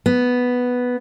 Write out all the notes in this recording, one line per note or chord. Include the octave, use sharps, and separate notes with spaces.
B3